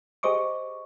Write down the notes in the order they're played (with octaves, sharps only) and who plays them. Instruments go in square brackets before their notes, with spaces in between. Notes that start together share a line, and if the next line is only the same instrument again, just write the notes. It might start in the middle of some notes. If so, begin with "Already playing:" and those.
[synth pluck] G4 G#4 C5 D#5 C#6 D6